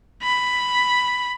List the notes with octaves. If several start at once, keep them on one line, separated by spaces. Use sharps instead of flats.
B5